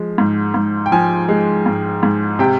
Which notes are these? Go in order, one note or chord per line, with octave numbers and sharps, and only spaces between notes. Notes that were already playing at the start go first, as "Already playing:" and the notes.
Already playing: F3 G#3
G#2
G#2
G5
F3 G#5
G#3
G#2
G#2
C3 G5